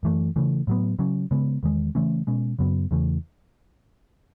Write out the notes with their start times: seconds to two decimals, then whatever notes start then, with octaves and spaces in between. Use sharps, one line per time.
0.03 F#2 E3 A3
0.36 C#3 E3 A3
0.67 A2 F#3 B3
0.99 C#3 F#3 C#4
1.31 C#3 G#3 B3
1.63 E2 D#3 G#3
1.95 C#3 E3 A3 C#4
2.27 B2 G#3 C#4
2.59 F#2 C#3 F#3 B3
2.91 E2 C#3 E3 A3